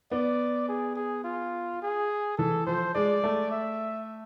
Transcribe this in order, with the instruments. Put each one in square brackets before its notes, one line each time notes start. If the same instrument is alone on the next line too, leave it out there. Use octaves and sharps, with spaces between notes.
[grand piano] B3 [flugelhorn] D5
[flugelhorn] G#4
G#4
F4
G#4
[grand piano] E3 [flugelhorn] A4
[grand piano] F3 [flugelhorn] C5
[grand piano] G#3 [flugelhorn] D5
[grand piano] A3
[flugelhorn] E5